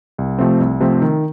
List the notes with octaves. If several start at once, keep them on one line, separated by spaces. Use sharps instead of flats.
C2
C3 F3 A3 C4
C2
C3 F3 A3 C4
D#3